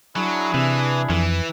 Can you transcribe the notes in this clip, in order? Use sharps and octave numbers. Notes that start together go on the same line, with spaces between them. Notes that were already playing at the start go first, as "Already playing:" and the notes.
F#3 D4 E4 G#4
C3 E3
F2 E3